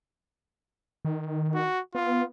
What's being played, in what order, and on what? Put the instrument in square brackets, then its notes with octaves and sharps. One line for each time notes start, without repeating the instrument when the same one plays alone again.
[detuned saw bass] D#3
[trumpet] F#4
[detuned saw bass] B3 [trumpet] F4